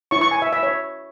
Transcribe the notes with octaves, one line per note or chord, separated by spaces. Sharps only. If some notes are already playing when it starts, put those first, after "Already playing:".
E4 C#5 C#6
C#6
G#5
E5
E5
C#5